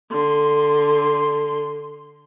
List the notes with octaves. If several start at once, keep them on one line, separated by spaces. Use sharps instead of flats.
D3 C6